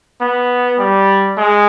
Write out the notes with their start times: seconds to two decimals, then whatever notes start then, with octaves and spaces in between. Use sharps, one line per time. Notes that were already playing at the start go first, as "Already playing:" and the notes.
0.21 B3
0.79 G3
1.38 G#3